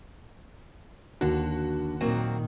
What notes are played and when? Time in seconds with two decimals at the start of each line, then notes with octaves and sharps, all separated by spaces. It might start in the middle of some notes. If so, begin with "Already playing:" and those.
1.21 D#2 D3 F#4
2.00 A#2 D#3 F#3 A#3 C4